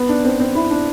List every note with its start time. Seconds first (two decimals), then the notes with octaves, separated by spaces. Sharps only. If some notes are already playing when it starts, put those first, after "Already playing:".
Already playing: B3
0.09 D4
0.25 C4
0.40 C4
0.55 E4
0.71 D4